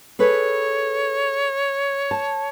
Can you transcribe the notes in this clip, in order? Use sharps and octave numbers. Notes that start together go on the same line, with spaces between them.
G#4 A4 B4 C#5
A5